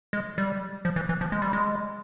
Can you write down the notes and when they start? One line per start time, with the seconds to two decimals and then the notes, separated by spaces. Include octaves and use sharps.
0.13 G#3
0.38 G3
0.85 F3
0.96 E3
1.09 E3
1.21 F3
1.32 G#3
1.42 G3
1.53 G#3